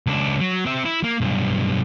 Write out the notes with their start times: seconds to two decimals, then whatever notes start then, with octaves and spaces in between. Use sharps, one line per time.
0.07 C#2 D4
0.41 F#3
0.66 C4 E5
0.85 E4
1.03 A#3
1.21 B1 G2